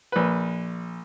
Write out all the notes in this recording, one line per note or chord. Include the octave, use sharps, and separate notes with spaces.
A#1 B4